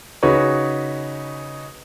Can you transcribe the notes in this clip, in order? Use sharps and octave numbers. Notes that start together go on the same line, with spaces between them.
C#3 D#4 F#4 B4 C#5